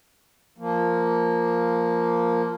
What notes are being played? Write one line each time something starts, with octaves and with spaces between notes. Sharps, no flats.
F3 A#3